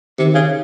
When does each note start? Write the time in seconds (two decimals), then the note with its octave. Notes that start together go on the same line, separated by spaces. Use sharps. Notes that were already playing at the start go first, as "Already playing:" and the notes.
0.19 C3 D#3
0.35 C#3